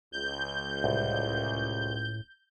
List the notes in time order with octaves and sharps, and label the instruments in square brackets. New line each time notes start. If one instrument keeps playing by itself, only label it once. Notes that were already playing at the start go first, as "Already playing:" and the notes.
[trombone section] C#2 [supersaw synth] G6
[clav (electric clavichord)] C2 [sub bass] A2